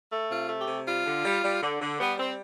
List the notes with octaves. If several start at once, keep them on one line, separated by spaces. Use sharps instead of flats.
A3
C3 F4
A3
G4
C3
G3 F4
D3
G3
G3
D3
D3
G3 B3
G3 C4